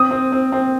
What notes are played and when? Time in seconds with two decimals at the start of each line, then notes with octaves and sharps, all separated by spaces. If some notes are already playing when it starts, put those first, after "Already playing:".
Already playing: C4 D#6
0.11 C4
0.32 C4
0.52 C4